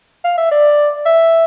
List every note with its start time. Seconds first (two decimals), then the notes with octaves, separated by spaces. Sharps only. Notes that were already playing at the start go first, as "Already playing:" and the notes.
0.24 F5
0.38 E5
0.51 D5
1.06 E5